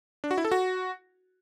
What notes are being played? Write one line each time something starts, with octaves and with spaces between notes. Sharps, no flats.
D4
F#4
E4
A4
F#4